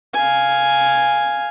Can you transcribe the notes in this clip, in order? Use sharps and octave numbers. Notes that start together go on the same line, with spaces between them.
F5 G#5